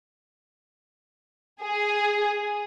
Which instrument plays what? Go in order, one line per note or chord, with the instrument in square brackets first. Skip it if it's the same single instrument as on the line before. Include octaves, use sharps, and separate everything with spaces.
[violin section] G#4